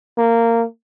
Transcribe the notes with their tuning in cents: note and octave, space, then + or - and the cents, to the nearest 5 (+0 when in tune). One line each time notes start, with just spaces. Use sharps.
A#3 -15